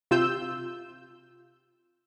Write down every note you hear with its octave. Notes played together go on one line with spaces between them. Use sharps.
C3 F4 E6 G6